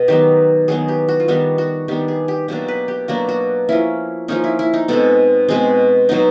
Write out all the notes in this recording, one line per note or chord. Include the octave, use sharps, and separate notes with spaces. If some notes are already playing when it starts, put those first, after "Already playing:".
Already playing: B2
D#3 F#3 B3 G4
D#3 F#3 B3 G#4
G4
F#4
F4
D#3 G3 B3 D4 F#4
F#4
D#3 G3 B3 D4 G4
G#4
G4
B2 F#3 A#3 D4 G4
B4
G4
B2 F#3 A#3 D4 F#4
F#4
F3 A#3 C#4 E4
F3 A#3 C#4 D#4
E4
E4
D#4
B2 G#3 C4 A4
B2 G#3 C4 G#4
B2 F#3 B3 D#4